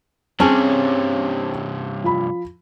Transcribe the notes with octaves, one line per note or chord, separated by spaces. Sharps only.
G2 C3 C4 C#4 G#4 A5
F3 B5